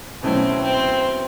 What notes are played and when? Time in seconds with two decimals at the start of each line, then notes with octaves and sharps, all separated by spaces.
0.23 B2 F#3 A3 C4 C#4 E4
0.63 C4